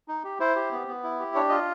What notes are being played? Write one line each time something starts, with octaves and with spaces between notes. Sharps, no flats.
D#4
G4
E4 C5
G4
B3
B3
E4
G4
D4 C#5
F4 D#5